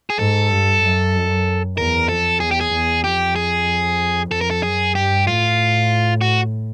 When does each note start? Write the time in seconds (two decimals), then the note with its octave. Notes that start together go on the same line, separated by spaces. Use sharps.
0.10 G#4
0.18 G#2 A4
0.50 G2
0.82 G2
1.14 F#2
1.77 E2 A#4
2.09 F2 A4
2.40 E2 G#4
2.51 G4
2.61 G#4
2.73 E2
3.04 F2 G4
3.36 G#4
4.31 F2 A4
4.41 A#4
4.51 A4
4.63 F#2 G#4
4.95 G2 G4
5.26 A2 F4
6.21 F#4